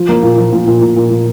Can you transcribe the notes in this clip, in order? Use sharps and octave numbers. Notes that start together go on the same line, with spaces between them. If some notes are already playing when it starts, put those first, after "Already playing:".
Already playing: F3
A#3
A#2
F3
A#2
A#2
A#2
A#2
A#2